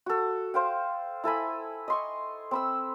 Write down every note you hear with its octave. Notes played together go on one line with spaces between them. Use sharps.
F#4 A4
C5 F5 G5
E4 A4 G#5 B5
D#5 C6 C#6
C4 B5 E6